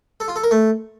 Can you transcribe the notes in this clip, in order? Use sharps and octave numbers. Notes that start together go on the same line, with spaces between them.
A4
F4
A4
A#4
A3